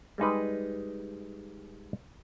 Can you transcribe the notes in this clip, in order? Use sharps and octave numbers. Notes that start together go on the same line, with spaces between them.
G3 G#3 D#4 B4